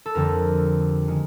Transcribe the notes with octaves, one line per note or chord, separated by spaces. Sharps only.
A4
F2 D3 G3 A#4
D#3 G#3